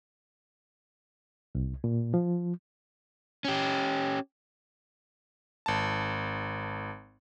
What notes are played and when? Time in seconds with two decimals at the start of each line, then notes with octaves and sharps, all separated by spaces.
1.55 C2
1.84 A#2
2.14 F3
3.45 C#4 G4
5.66 G#1 A5